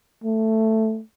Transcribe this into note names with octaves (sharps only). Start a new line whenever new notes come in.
A3